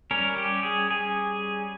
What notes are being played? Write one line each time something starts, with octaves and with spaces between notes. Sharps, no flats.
G3 C#4 A#4
G4
G#4
G#4